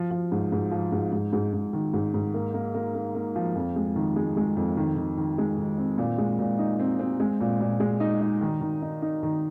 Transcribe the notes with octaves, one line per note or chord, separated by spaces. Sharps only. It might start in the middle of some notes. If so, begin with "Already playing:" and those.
Already playing: F3
F3
G#2
G#2
F3
G#2
G#2
G#2
G#2
D#3
G#2
G#2
A#3
A#3
A#3
A#3
A#3
F3
F2
G#3
D#3
G#3
G#3
F2
D#3
D#3
D#3
G#3
D#3
C4
A#2
G#3
A#2
D#4
C4
C4
G#3
A#2
A#2
G#3
D#4
D#4
D#3
D#3
D#4
D#4
D#3